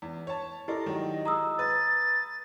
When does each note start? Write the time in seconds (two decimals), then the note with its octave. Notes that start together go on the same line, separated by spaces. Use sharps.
0.02 E2
0.27 C#5 A5
0.68 E4 G4 A4 A#4 D5 D#5
0.86 D#3 F#3
1.25 G#3 A#5 D#6 E6
1.59 B4 A6